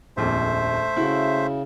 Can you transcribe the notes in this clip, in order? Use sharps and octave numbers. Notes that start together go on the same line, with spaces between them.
D#1 A#1 F2 A3 C5 E5
C#3 E4 F#4